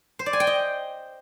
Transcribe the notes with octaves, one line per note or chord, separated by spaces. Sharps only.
C5
D5
G#5
G5
D#5